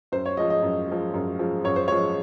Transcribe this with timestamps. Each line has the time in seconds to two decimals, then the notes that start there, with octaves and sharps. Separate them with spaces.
0.12 F#2 C5
0.26 C#5
0.37 F3 G#3 D#5
0.50 D#5
0.63 F#2
0.88 F3 G#3
1.14 F#2
1.39 F3 G#3
1.64 F#2 C#5
1.76 C5
1.88 F3 G#3 C#5